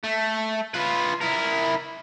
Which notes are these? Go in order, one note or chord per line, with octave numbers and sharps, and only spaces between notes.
A3
F4 B4
E4 A#4